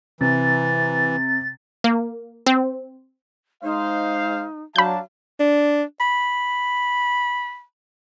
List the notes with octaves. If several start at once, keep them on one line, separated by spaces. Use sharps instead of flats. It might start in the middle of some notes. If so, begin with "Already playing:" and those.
C3 E3 A6
A#3
C4
G#3 D#4 C5 F5
F#3 D4 F5 A5 B5 G6
D4
B5